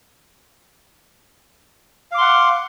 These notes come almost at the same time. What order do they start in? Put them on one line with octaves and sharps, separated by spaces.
F5 D6 C6 F#5